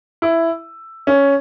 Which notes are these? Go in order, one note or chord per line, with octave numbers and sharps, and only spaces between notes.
E4
C#4